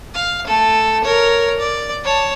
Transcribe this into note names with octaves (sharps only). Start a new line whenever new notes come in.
F5
A3 A4
A#4 C#5
D5
C#5 A5